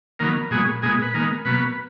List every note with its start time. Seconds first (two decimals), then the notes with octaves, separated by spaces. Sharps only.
0.19 D#3 F#3 A#3 B3 A#4
0.51 A#2 F#3 G#3 B3 G#4
0.82 A#2 G#3 B3 G#4
1.02 B4
1.14 D#3 G#3 A#3 B3 A#4
1.45 B2 F#3 A#3 B3 B4